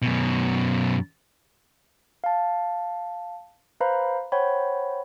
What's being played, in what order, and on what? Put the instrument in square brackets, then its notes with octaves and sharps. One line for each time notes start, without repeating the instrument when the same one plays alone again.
[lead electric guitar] F#2 B2
[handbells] F5 A5
B4 C5 F5 A#5 B5
C5 C#5 F#5 G5 B5